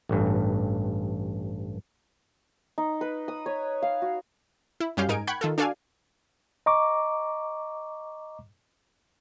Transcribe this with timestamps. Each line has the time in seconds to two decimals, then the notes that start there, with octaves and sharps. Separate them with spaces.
0.09 A1 G2
2.78 D#4
3.01 B4
3.28 D#6
3.46 C#5
3.82 F5
4.02 F#4
4.80 E4
4.97 F#2 G3 C#4 G4 F5 G6
5.09 G#2 D#4 A#4 G#5 D7
5.27 F#5 G5 B5 C#6 F#6 G#6
5.41 D#3 F4 A4
5.58 D4 F#4 A4 D5 F5 G#5
6.66 D#5 A#5 C#6 D6